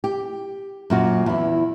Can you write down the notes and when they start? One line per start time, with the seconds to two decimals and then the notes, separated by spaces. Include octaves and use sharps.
0.04 G4
0.90 F#2 A#2 F#4
1.26 E2 E4